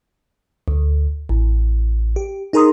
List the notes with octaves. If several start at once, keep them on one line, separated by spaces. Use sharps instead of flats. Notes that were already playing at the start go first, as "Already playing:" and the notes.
D2
A1
G4
D#4 G#4 A#4 A#5 C6 D#6